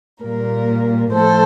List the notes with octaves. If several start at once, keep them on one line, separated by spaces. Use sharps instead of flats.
A#2 G3 A#3 A#4
A2 F3 A3 A4 C5